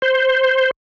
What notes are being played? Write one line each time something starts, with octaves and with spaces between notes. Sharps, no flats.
C5